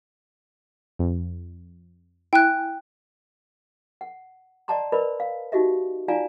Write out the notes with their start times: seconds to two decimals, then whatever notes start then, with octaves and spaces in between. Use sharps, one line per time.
0.99 F2
2.33 E4 G5 G#5 F#6
4.01 F#5
4.68 D5 D#5 F#5 A5 A#5 C6
4.92 A#4 B4 D5 D#5 B5
5.20 F5
5.52 D#4 F#4 G4 D#5 E5
6.08 D#4 F4 D5 F5 G#5 A#5